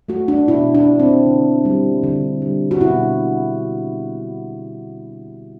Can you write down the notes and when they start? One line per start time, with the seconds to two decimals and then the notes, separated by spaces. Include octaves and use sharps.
0.09 A3 F#4
0.28 D4
0.48 B2 E4
0.74 D4
0.87 A3
1.00 C4
1.26 D3
1.65 G3
2.03 D3
2.42 G3
2.71 F#4
2.81 B2 E4